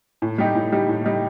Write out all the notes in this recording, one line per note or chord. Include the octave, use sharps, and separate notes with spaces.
A2
G3 D#4 G4
A2
G3 D#4 G4
A2
G3 D#4 G4